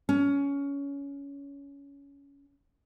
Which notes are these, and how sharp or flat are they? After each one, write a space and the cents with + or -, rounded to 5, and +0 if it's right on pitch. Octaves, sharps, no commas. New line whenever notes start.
C#4 +20